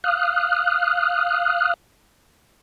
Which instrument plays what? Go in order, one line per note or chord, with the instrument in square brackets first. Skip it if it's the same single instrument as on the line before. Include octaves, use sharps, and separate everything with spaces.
[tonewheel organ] F5 D#6 F6 F#6